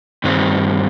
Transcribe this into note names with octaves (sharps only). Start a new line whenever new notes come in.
G2 D#3 G3 C4